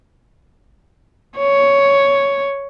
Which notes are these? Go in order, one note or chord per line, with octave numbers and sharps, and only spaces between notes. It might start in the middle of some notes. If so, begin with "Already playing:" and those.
C#5